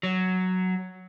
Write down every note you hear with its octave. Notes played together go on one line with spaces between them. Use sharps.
F#3